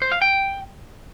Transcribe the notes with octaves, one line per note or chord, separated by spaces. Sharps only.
C5
F5
G5